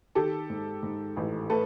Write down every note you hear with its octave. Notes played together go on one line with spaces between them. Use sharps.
D#3 G4 A4
G#2
G#2
A1
A3 A4 B4